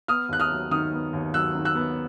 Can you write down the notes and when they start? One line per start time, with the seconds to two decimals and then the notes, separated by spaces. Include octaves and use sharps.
0.08 B3 D#6 F6
0.29 D#2 F#6
0.40 D#6 F6
0.51 F#3
0.71 D#3 D#6 F6
0.92 B3
1.13 D#2
1.34 F#3 E6 F#6
1.55 D#3
1.65 E6 F#6
1.75 B3